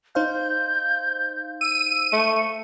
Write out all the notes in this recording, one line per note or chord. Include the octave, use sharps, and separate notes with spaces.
D#4 C5 F5 G6
E6 D#7
A3 C#7